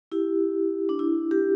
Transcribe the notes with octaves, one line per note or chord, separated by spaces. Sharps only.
E4 G4
D4
E4
G4